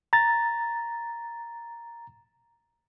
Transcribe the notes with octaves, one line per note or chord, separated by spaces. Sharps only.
A#5 A6